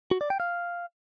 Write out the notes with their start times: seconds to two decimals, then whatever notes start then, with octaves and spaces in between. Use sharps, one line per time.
0.11 F#4
0.21 D5
0.30 G5
0.40 F5